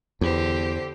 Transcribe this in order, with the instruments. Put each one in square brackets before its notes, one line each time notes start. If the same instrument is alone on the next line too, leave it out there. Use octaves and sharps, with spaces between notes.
[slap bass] E2 [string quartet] D3 G4 C5